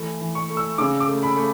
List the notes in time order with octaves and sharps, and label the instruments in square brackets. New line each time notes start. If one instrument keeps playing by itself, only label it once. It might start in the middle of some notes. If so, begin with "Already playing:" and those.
Already playing: [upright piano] E3 A3
E3
C#6
A3
E6
C#3 D6
D6
A3
B5
A3